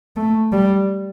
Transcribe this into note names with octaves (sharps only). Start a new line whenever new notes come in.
A3
G3